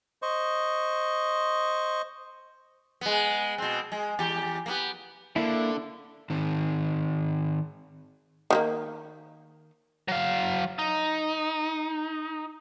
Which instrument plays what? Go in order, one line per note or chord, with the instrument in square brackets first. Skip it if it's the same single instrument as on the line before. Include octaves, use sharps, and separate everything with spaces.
[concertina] C5 D#5 C#6
[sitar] G#3 B3
B2 C4
G#3
E2 G4
A#3 B3 G4
[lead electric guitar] D3 [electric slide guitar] A#3 E4
[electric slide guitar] D#3 C4
[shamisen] D#3 G3 A#3
[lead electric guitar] F#3 F5
D#4